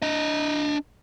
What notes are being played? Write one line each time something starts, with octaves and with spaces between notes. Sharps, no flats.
D4 D#5